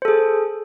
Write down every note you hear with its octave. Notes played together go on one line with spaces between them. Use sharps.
G#4 A4 C5